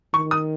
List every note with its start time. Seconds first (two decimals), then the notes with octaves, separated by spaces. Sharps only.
0.14 D#3 C#6
0.31 D#6